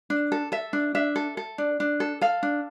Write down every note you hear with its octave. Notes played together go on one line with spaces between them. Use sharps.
D4
A4
A4 E5
D4
D4 E5
A4
A4
D4
D4
A4
A4 F5
D4